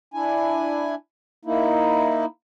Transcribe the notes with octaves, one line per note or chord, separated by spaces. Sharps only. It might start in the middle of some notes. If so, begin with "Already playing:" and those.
D4 E4 G#5
A#3 D#4 E4